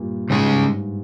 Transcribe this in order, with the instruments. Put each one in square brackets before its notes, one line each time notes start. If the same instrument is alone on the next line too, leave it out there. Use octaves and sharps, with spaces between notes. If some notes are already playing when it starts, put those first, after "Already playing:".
Already playing: [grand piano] G2 A#2
[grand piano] G#2 [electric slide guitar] C#3 G#3 C#4 G#4
[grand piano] G2